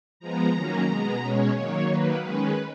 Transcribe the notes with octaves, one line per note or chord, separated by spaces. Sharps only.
F3 G#3 B3 A#5
D#3 F#3 A#3 C#4
B2 G#3 B3
B2 G#3 C#4 C#5
D#3 F#3 A#3 C#5
D#3 F#3 A#3 B4
D#3 G#3 C#4 B4